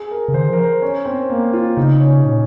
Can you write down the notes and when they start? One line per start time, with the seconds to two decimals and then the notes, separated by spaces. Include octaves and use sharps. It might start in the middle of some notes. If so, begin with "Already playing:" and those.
Already playing: G#4
0.11 A#4
0.28 C#3
0.34 D#3 C5
0.50 F3 A#4
0.58 C5
0.82 C#4
1.05 C4
1.30 A#3
1.53 F4
1.77 C#3 D#4
2.00 C#4
2.18 C3
2.24 A#2 C#4